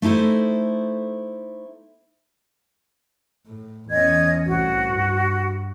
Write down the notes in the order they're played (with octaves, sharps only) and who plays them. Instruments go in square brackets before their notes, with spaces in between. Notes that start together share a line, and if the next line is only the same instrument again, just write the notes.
[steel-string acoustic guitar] A3 D#4 E4 A4 C5
[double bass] A2
[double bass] E2 C#4 [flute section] D#5 G#6
[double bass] C2 A2 [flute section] F#4
[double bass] G2